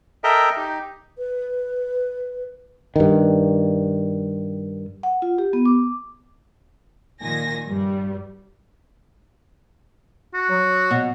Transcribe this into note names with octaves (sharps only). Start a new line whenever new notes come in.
A4 A#4 D#5 E5 G5 A#5
D#4 G4
B4
G2 D#3
F#5
F4
G4
B3
D6
A#2 D#3 G#5 A#6
G2 G3
F#4
F#3
B2